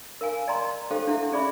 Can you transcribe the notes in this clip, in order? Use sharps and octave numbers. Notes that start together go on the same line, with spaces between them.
A#4 F5 G#5
D5 D#5 G5 A#5 C6
G4 A4 C5 F5 G5
D4 E4 G4 A4 E5 F#5
C#4 G#4 D5 E5 B5 C#6